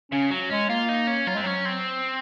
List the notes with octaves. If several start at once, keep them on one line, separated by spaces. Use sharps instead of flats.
C#3 C#4
F#3
G#3 C#4
A#3 F4
D#4
C#4
F#3 F4
G#3 C4
F#3 C#4
C4